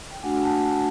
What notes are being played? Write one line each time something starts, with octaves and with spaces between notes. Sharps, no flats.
G5
A3 D4 F#4 F#5 G#5
G5 A5